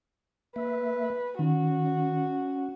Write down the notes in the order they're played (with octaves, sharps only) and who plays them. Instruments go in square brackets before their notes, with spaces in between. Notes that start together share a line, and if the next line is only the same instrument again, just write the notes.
[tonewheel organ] A#3 E5 [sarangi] B4
[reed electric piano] D#3 [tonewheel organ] C#4 [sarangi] F#4